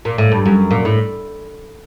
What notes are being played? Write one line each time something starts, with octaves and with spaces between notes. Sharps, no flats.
A#2
A2
G2
F#2
A#2
A2